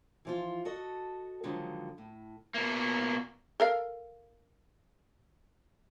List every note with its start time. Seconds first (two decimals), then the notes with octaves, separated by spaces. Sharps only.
0.25 E3 F3 F4
0.65 F#4 A4 D#5
1.44 D3 D#3 F3 F#3 G#3
1.98 A2
2.54 B2 A#3
3.60 A4 A#4 F5